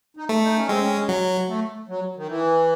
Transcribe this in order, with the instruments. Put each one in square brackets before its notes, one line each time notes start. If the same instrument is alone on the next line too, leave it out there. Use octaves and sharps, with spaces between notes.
[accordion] D#4
[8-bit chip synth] A3
[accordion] D#4
C#4
[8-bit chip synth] G#3 [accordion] C4
[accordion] C#4
[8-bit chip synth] F#3
[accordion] A3
F#3
D#3
E3